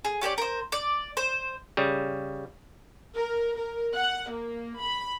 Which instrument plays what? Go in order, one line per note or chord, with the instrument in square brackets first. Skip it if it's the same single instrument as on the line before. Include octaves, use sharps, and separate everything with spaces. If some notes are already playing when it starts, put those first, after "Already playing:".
[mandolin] G#4
C#4 G4 C5 D5
A#4 C5
D5
C5
[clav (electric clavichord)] C#3 G3
[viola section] A#4
A#4
F#5
A#3
B5